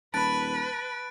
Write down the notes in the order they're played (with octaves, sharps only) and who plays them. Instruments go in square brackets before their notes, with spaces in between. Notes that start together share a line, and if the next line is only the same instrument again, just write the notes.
[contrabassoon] D#1 [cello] B4 [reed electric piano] A5 B5 [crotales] F#6 A6 D7